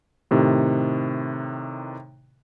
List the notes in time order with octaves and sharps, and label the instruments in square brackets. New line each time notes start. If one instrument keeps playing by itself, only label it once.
[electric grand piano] A2 C3 D#3